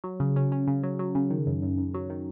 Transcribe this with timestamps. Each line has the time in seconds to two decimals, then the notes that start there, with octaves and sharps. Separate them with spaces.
0.04 F#3
0.20 C#3
0.36 C#4
0.52 C#4
0.68 C#3
0.83 F#3
0.99 F#3
1.15 C#3
1.31 D#3
1.47 F#2
1.62 F#2
1.78 F#2
1.94 F#3
2.10 D#3